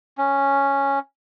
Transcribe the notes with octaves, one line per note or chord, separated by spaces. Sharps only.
C#4